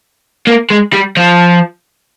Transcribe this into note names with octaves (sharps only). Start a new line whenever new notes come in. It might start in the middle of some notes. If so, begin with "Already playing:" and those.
A#3
G#3
G3
F3